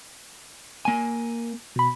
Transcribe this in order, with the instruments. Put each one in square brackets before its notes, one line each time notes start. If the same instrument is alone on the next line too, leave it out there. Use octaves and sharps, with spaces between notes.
[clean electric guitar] A#3 G#5
[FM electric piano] B2 B5